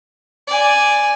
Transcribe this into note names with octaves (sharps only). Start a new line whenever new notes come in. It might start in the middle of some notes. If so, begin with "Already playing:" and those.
D5 G#5